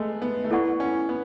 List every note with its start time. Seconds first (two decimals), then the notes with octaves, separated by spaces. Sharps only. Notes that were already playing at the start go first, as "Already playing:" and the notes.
Already playing: G#3 A3 B3
0.22 B3
0.44 A3
0.51 B3 E4 A4 D5 F#5 C#6
0.80 C#4
1.09 B3